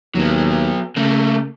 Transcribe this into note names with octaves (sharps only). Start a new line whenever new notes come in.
D#2 F#3 B3
C#3 A3 A#3